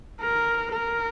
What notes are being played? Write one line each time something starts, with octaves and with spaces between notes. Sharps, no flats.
A#4
A#4